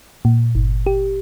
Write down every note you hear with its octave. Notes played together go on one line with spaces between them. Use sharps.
A#2
G1
G4